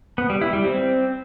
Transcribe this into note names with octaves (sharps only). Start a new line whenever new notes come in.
B3
G3
E4
G3
C4